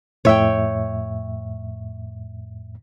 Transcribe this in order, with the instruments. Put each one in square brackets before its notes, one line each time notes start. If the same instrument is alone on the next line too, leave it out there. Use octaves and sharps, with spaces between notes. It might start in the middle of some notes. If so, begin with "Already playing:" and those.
[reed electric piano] F2 A2 E5 [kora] C#5 G5